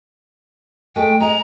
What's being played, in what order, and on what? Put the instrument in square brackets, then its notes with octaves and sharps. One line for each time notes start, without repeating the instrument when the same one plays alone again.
[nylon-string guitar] G#3 A3 [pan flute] G5
[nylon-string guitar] G#3 D#5 [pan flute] A#5